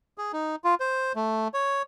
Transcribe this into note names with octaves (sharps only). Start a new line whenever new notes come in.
G#4
D#4
F4
C5
A3
C#5